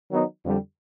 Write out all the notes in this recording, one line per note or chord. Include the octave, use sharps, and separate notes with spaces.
D#3 F#3 B3 D#4
F2 D3 G3